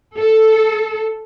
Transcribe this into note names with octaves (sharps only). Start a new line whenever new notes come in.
A4